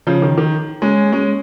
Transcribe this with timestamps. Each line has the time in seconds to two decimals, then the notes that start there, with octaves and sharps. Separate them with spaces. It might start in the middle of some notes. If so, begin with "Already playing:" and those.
0.07 C#3 F3
0.22 D#3
0.38 D#3
0.82 G#3 C#4
1.12 G#3 C#4